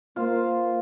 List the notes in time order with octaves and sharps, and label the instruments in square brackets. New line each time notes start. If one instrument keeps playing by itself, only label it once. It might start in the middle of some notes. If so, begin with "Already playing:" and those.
[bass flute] A#3 [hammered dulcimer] F4 C5